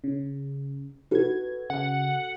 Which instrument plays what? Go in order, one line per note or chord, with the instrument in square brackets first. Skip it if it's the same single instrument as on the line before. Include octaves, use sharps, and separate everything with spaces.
[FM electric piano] C#3
[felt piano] F#4 A4 [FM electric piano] B4 G#6
[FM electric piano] C#3 [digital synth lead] F#5